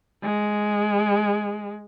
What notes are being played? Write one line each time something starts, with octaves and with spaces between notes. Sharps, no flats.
G#3